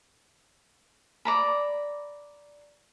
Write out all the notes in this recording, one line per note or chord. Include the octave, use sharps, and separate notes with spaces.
D5 A#5 B5